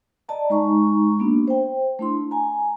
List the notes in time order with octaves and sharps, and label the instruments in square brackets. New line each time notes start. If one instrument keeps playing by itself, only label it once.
[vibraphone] D5 D#5 A5 A#5
G#3 D#4 A#5 C#6
A#3 B3 D4 F#4
C5 G5
A3 D4 E4 C6
G#5 A#5